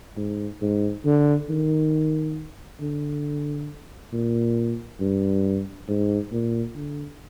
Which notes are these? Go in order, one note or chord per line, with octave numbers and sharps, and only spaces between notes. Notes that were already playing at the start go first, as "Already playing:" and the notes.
G#2
G#2
D3
D#3
D3
A#2
G2
G#2
A#2
D3